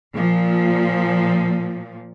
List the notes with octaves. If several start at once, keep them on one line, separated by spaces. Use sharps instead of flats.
A#2 F3